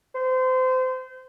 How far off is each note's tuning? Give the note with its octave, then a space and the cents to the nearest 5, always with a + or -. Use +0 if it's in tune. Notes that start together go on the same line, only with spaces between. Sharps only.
C5 -30